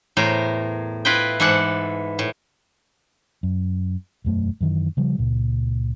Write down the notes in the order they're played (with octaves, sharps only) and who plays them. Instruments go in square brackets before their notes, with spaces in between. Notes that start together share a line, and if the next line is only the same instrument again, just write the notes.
[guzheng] E2 A2 A#4 C5
E4 F4 B4 D#5 G5
G#2 E3 A4 D5 F#5 A5
A2
[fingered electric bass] F#2
E1 F#2 A3
F#2 D#3 E3
C#3 F3 G3
C#2 A#2